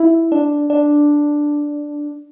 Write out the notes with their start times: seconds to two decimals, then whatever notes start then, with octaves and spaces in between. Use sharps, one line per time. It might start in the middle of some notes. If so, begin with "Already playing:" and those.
Already playing: E4
0.32 D4
0.70 D4